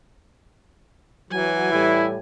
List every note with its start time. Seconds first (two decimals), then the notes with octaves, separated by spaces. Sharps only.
1.31 E3 F#3 G#5
1.72 A2 G3 E4